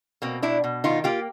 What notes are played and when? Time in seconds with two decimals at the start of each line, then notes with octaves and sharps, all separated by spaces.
0.22 B2 A#3 C4
0.42 B2 D4 E4
0.64 B2
0.84 D#3 D#4 F4
1.04 A#3 F4 G4